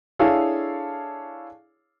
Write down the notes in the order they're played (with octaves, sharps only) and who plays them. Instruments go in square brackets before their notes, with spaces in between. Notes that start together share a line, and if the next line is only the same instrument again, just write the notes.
[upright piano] D4 E4 G#4 A4 C#5 F5